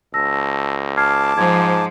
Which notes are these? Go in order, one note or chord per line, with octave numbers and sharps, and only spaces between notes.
C#2 A5 E6 A#6
A5 D6 F6 G#6 C7
G#2 F3 C5 G#6